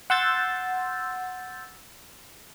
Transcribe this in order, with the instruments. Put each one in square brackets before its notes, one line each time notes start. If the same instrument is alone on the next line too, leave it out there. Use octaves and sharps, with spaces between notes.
[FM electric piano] F#5 C6 E6 G6 A6